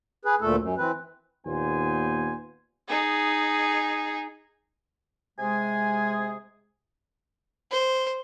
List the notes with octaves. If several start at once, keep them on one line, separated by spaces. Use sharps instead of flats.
G#4 B4
D2 A#2 A3 A4
F#2
E3 C4 B4
D#2 A#2 B3 C5 G#5
D#4 G#4
C3 G#3 G#4 G#5
C5